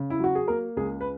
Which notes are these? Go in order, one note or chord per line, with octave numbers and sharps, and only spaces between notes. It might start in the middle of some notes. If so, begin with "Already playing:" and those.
Already playing: C#3
E4
F#3 F#4
G#4
A#3 A#4
C#2 G#4
B4